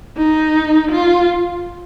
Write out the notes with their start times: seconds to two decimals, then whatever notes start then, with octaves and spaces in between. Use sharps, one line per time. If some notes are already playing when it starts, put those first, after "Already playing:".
0.17 D#4
0.91 F4